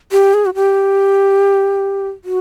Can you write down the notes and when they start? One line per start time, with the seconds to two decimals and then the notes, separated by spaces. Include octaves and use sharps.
0.12 G4
0.34 G#4
0.46 F#4
0.55 G4
2.25 F#4